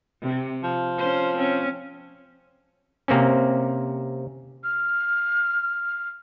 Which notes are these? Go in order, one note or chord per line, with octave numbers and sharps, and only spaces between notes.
C3
F3
C#4 C5
C4 C#4
C3 A#3 C4 C#4
F6